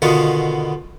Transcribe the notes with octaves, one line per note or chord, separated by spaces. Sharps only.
B2 D3 D#3 B3 F4